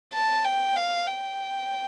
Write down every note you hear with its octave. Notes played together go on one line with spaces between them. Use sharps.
A5
G5
F5
G5